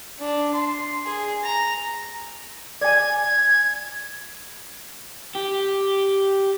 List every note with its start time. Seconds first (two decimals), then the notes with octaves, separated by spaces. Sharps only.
0.20 D4
0.54 C6
1.05 G#4
1.44 A#5
2.81 D5 G#5 G#6
5.35 G4